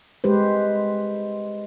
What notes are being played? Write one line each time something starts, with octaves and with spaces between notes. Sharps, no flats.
G#3 G4 B4 C5